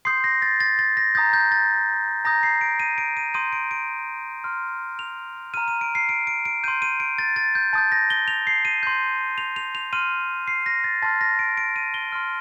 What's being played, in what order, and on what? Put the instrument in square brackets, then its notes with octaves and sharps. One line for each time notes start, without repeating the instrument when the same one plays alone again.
[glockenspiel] C6 D#6 G6 C7
A#6
A6
A6
A6
A#6
A#5 D#6 G6 A6
G6
A6
A#5 D#6 G6 A#6
C7
D7
D#7
D7
D#7
C6 D#6 G6 D#7
D7
D7
C6 F6
F7
A#5 F6 D#7
D#7
D7
C7
D7
D7
D7
C6 G6 D#7
D#7
D7
A6
A6
G6
A5 D#6 G6 A6
A#6
G7
F7
C7
D#7
C6 G6
F7
F7
F7
C6 F6 D#7
C7
A#6
A6
A5 C6 F6 A6
A#6
D7
D7
D#7
G7
C6 F6